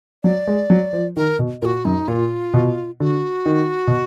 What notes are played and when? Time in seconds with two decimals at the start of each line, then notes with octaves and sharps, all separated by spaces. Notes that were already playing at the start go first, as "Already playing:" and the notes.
0.24 F#3 D5
0.47 G#3
0.70 F#3
0.93 F3
1.17 D#3 A#4
1.39 B2
1.62 A#2 A#4
1.65 F#4
1.85 F#2 D#4
2.08 A#2 F4
2.54 B2
3.00 D3 F#4
3.46 D#3
3.87 B2